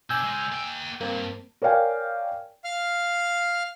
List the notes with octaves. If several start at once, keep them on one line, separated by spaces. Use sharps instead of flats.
B2 D4 G#5 E6 G6
C#2 G#3
A#3 G5
G2 A#3 C4
A#4 C#5 D5 F5 G5 G#5
F5 F6